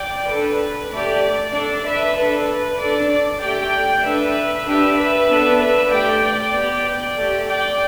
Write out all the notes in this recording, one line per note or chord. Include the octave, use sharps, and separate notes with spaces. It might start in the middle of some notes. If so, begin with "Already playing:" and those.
Already playing: D5 G5
D4 A4 B4
A3 G4 D5
D5
D4 A4 D5
B4 E5
D4 A4 B4
B4
D4 A4 D5
D5
A3 G4 D5 G5
D4 A4 B4 E5
D4 G4 B4 E5
B4 E5
B3 D4 A4
B4 E5
A3 G4 D5 G5
D5 G5
B3 G4
D5 G5
A3 G4
D5 G5